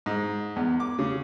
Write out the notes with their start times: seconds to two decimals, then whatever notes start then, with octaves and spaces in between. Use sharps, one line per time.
0.06 G#2
0.56 E2
0.80 D6
0.99 C#3